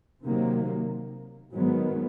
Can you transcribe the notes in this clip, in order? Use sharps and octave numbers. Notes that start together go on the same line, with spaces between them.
C3 D#3 F#3 A#3
G#2 D#3 F#3 B3